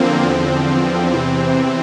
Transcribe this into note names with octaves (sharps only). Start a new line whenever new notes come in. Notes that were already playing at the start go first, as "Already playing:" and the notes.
Already playing: E2 D3 F3 A#3 C4
E2 D3 F3
E2 C3 E3